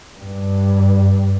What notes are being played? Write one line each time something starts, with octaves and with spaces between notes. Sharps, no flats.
G2